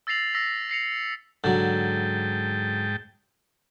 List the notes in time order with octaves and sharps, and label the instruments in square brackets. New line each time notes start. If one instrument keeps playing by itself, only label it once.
[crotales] E6 A6 A#6 C7 F7 F#7
E6 A#6 B6
A#6 C7 C#7 F7
[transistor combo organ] G#2 G5 A5 [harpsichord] D3 F#3